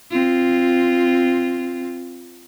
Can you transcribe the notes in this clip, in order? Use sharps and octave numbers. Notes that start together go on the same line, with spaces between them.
C4 F4